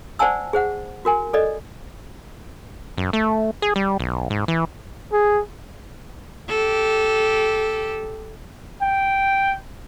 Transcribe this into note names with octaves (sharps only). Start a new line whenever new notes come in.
C5 D5 F#5 G#5 A5 E6
G#4 C5 F#5
F#4 A#4 G#5
A4 D5 D#5
F#2
A3
G#4
G3
B1
G#2
E3
G#4
G4 A4
G5